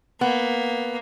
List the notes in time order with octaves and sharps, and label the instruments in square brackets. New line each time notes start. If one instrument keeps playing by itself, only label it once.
[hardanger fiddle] A#3 [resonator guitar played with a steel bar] B3